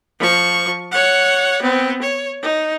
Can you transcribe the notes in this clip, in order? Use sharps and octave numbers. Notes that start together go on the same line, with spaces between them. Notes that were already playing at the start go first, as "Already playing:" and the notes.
F3 C#6
C#5 F#5
B3 C4
C#5
D#4